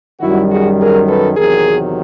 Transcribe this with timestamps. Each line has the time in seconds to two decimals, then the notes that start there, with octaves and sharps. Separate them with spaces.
0.20 F#2 D#3 G3 E4 F#4
0.49 F#4 G#4
0.79 G#4 A#4
1.08 A4 B4
1.37 E2 C3 D#3 F#3 G#4 A#4